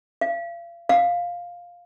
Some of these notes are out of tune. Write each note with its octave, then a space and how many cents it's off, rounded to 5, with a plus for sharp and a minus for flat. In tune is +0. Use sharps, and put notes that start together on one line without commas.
F5 -35
F5 +5